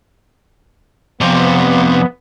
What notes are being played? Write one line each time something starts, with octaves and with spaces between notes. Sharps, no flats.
F2 C3 B3